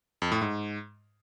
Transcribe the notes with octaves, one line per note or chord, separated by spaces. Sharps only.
F2
A2
G#2